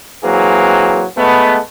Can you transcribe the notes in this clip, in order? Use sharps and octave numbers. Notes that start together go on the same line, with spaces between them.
E3 F#3 A#3 C4 G#4
G#3 A3 B3